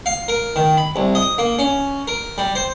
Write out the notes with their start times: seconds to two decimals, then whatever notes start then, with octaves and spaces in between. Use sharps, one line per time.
0.06 F5
0.28 A#4
0.56 D#3
0.77 B5
0.96 C2
1.15 D#5
1.38 A#3
1.59 C#4
2.08 A#4
2.38 G3
2.55 C5